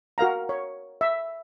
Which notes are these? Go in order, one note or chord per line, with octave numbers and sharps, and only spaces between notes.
F#4 A#4 F5 A#5
C#5
E5